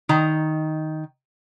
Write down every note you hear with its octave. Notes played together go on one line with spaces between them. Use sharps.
D#3 A#5